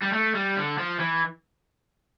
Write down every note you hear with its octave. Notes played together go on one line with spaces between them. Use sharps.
G3
A3
G3
D3
F3
E3